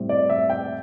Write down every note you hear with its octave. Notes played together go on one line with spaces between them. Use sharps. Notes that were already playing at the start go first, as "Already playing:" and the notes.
Already playing: A2 G3 C4
D5
E5
G5